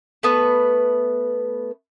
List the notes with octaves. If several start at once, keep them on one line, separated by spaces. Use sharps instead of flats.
A3 B3 B4